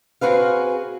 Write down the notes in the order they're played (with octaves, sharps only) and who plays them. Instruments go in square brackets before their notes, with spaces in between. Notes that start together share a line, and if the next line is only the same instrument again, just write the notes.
[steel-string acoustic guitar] C4 F#4 G#4 B4 F5